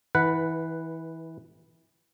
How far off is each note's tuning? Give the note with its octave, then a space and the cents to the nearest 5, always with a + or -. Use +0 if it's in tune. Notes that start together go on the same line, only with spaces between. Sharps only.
E3 -25 B4 +0 F#5 +0